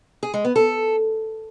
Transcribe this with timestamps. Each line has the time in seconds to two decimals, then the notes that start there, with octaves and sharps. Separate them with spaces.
0.23 G#4
0.34 G#3
0.45 B3
0.56 A4